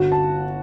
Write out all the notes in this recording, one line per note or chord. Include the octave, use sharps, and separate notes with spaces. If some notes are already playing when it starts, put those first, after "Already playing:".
Already playing: G1 F#4 F#5
A5